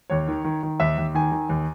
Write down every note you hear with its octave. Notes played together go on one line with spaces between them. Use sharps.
D#2 C#5
D#3
D#3
D#3
D#2 E5
D#2
D#3 G#5
D#3
D#2